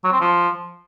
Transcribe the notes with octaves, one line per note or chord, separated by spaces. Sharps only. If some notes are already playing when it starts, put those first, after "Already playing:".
F#3
C4
F3